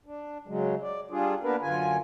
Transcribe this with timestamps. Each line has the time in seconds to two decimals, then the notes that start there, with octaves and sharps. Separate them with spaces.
0.06 D4
0.48 C#3 F#3 G#3
0.82 D5
1.11 G3 D4 F4 G#4
1.44 A#3 B3 D4 A#4 B4
1.62 F#2 D3 F4 G#5